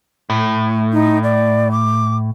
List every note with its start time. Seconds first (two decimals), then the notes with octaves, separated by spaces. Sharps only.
0.30 A2
0.93 D#4
1.23 D5
1.71 D6